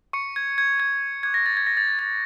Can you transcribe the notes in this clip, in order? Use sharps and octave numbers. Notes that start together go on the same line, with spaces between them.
C#6 C#7
G#6
G#6
G#6
D6 F#6 G#6
A#6
A6
G#6
A#6
A6
G#6
A6